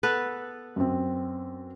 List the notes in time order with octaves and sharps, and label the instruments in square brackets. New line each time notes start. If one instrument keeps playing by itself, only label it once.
[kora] B3 A4 B4
[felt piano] F#2 C4